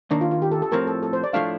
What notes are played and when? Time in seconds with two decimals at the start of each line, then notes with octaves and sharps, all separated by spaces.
0.11 D#2 D#3 A#3 D4
0.21 F4
0.31 F4
0.42 G4
0.52 A4
0.62 A4
0.72 A2 F3 C4 A#4
0.87 A4
1.03 A4
1.13 C5
1.24 D5
1.33 A2 F3 A3 D4 F5